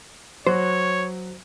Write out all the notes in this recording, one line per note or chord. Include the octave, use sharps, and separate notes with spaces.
F#3 F#4 C5 C#5